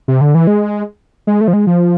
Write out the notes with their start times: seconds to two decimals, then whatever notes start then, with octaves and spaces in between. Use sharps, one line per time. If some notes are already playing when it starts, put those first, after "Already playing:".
0.08 C3
0.21 D3
0.35 E3
0.47 G#3
1.27 G#3
1.41 A3
1.48 F3
1.53 G#3
1.67 F3